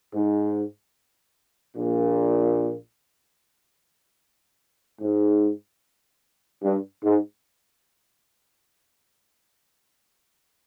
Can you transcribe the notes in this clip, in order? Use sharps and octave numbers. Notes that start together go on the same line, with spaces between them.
G#2
A#1 A#2
G#2
G2
G#2